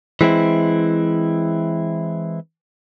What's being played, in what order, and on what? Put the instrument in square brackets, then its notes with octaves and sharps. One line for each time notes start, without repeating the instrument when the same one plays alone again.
[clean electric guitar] E3 G#3 C4 E4